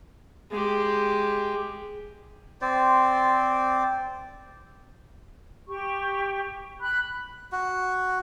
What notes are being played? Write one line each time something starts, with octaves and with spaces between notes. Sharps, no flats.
G#3 G4
C4 C5 D5
G4 C#6
B5 F#6
F#4